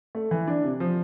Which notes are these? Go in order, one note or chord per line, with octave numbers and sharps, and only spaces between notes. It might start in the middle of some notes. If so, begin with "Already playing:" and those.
A3
E3
D4
C3
F3